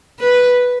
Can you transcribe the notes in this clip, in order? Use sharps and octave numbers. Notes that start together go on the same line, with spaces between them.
B4